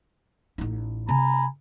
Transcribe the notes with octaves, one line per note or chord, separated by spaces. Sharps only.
A1 D#4
C3 G#5 A#5 B5